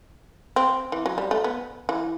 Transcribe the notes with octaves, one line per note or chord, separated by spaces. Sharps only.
C4
E3
F#3
G3
A3
B3
E3